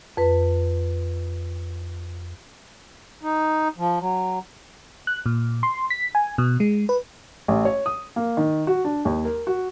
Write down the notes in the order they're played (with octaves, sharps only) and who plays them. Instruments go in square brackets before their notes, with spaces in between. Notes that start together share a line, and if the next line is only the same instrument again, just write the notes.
[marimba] F2 B4
[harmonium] D#4
F3
F#3
[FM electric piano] F#6
A#2
C6
B6
G#5
B2
G#3
B4
[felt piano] A1
C#5
D#6
A#3
D#3
F#4
D4
D#2
A#4
F#4